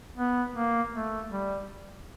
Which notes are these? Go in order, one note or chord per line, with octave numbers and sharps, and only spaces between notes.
B3
A#3
A3
G3